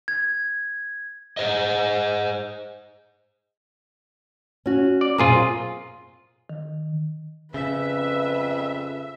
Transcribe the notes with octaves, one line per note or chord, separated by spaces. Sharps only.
G#6
G#4 C5 D#5
C#4 F#4
D5
F#2 B2 C4 F4 G#4 A#4
D#3
F2 C#3 B4 E5